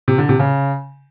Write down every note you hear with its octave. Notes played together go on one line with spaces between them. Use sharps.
C3
D3
C3
C#3